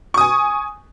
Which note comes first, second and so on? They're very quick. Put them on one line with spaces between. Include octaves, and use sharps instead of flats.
C#6 D#6 G#5